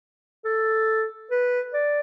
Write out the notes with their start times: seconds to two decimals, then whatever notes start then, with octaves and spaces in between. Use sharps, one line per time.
0.45 A4
1.31 B4
1.73 D5